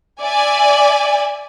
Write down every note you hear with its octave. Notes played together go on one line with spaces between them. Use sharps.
D5 E5 G#5